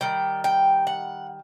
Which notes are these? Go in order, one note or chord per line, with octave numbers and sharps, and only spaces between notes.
D#3 G3 G5
G5
F#5